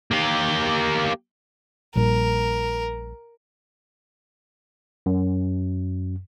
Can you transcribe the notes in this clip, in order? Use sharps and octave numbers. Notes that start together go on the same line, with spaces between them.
A#3 G4
A#1 A#2 G3 A#4
F#2